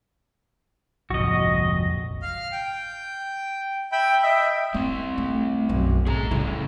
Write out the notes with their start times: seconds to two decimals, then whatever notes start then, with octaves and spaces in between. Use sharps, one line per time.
1.10 F1 A#1 F#4 D#5
2.22 F5 F6
2.52 G5
3.92 E5 G5 B5
4.23 D#5 E5 G5
4.74 G3 A#3 C4
5.18 A3
5.69 B1 F#2
6.07 A2 G#4 A5 A#5
6.31 C#3 G3 A3 E4